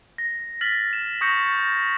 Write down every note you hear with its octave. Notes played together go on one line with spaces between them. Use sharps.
A#6
F6 A6 B6 F#7
E7
C#6 D#6 G6 A#6 C#7 E7